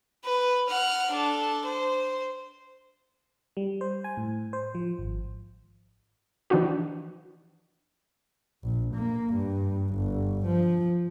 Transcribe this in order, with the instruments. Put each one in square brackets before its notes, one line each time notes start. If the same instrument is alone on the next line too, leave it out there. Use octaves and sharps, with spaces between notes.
[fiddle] B4
F#5 F6
D4 A4
C5
[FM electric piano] G3
C5
G#5
A2
C5
F3
G#1
[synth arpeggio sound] E3 F3 D4 D#4 F#4 G4
[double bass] A#1
A#3
G2
G1
F3